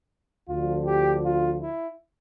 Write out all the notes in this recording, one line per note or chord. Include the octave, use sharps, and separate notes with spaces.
D2 D3 F3 F4
G4
F4
E4